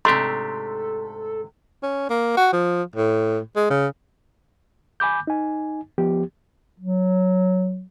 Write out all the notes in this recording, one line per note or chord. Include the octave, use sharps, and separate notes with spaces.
G#2 C3 A3 D4 G4 A4 C6
C#4
A#3
F#4
F3
A2
G#3
C#3
G#5 B5 D6 G6
D#4 G#5
F3 B3 G4
F#3